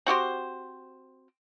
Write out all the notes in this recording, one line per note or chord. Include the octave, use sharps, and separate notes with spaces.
C4 F#4 G4 C5